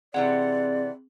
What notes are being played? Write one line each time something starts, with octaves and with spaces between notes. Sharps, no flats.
C3 E3 C4 G#4 D5 F#5